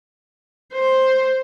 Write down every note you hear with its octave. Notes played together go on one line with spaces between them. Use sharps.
C5